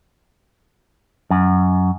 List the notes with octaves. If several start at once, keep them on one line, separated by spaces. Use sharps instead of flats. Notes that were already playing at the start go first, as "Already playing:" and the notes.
F#2